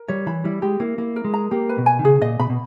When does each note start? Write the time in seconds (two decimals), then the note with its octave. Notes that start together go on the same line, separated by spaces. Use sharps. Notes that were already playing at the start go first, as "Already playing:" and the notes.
Already playing: A#4
0.08 G3 C#5
0.26 E3 B5
0.44 G3 E4
0.62 G#3 G4
0.80 A#3 E4
0.98 A#3 E4
1.16 A#4
1.25 G#3
1.34 A#5
1.51 A#3 G4
1.69 B4
1.78 B2
1.86 G#5
1.99 D#3
2.04 C#3 G#4
2.21 A#2 D#5
2.40 B2 B5
2.50 B2